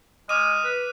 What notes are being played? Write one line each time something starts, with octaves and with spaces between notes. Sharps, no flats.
G#3 D#5 D6 F6 D#7
B4